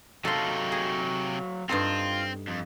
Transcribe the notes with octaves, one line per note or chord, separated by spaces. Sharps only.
C3 F#3 D#4 A4 F5 C6
G#4
G2 C4 D#4 F4 A4
F2